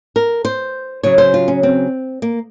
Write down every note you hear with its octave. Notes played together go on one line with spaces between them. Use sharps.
A#4
C5
C#3 F#3 C#5
C5
F4
C#4
C4
A#3